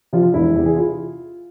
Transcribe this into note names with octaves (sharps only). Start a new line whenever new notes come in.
C3 F3 F4
F4
E1 E4
E2 C3
G#4
F4